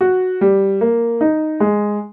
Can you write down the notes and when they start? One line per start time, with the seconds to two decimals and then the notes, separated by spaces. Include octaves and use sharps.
0.01 F#4
0.41 G3
0.81 A#3
1.21 D#4
1.60 G#3